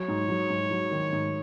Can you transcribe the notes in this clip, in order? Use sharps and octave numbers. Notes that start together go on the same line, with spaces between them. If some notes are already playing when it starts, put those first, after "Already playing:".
Already playing: F#3 C#5
G#2
F#3
G#2
F#3
D#3
G#2